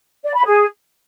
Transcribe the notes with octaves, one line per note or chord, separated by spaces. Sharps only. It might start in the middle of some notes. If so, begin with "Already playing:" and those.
D5
B5
G#4